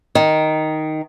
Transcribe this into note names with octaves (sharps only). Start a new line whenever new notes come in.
D#3